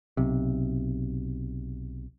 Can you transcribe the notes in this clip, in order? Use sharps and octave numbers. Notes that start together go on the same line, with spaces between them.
B1 C3